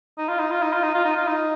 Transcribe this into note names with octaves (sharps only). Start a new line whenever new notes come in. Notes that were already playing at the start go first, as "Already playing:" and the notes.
D#4
F4
D#4
F4
D#4
F4
D#4
F4
D#4
F4
D#4